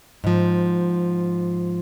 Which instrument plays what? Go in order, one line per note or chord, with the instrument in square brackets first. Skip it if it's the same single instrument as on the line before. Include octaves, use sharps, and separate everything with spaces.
[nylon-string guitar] G#2 F3